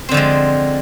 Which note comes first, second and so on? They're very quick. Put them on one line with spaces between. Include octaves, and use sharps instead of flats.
C4 D3 F3 G#3